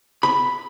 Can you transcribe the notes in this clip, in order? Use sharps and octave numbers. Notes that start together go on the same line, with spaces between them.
B5